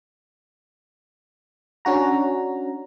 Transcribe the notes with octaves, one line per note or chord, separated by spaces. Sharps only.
C#4 D4 F#4 A#5